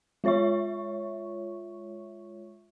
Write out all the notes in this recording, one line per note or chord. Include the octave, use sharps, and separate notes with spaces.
G#3 F4 C#5 E5 C#6